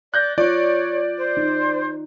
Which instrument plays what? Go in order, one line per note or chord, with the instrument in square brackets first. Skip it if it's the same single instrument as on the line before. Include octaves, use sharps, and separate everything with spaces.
[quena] D5 [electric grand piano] F#6 G6 A#6
[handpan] F4 [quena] C#5 [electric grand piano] D5
[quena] C5
[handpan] D#4